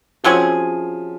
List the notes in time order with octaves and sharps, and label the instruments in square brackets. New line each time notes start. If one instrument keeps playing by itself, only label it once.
[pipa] C3 F#3 C#4 G#4 [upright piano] F3